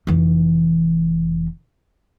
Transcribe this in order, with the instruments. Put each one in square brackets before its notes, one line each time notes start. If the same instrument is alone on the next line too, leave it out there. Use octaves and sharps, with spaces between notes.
[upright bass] F1 E3